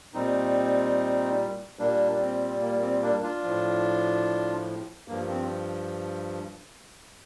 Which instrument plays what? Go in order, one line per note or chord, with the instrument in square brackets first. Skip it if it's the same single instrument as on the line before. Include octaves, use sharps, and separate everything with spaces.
[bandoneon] A#2 G3 C4 D#4
A#2 G3 A#3 D4
C4
A#3
C4
A#3 D4
D4 F4
A2 F3
G2 F3 A#3
C4